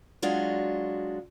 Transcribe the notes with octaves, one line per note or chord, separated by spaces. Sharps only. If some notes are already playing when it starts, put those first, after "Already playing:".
F#3 G#3 D4 F4 F#4